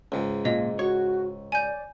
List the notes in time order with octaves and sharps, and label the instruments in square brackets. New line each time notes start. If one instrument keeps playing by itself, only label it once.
[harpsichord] C#2 G#2
[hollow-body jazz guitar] A#2 [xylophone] D#5
[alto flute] F#4 [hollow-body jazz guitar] C#5
[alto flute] D5 [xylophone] G#5 G6